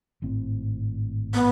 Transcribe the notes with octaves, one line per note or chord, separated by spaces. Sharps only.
G#1 A2 C4
B3